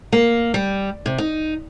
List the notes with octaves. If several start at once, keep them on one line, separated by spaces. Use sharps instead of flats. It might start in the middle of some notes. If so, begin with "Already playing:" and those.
A#3
G3
C3
D#4